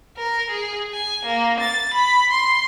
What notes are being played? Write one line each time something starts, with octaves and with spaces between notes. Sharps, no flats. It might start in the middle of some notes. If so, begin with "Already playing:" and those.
A#4
G#4
G#5
A#3
A6
B5
C6